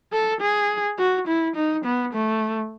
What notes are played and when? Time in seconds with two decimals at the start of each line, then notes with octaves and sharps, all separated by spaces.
0.13 A4
0.41 G#4
0.99 F#4
1.28 E4
1.56 D#4
1.85 B3
2.14 A3